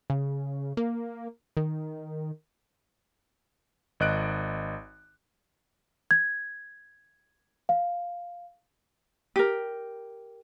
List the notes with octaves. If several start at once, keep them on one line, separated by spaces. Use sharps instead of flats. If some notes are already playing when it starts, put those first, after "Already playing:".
C#3
A#3
D#3
G#1 D#5 F#6 D7
G#6
F5
G4 A#4